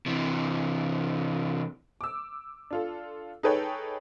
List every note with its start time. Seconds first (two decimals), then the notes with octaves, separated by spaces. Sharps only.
0.06 C3 E3
2.01 D6 E6
2.71 D4 F4 A4
3.43 D#4 G#4 A4 B4 C#5 G5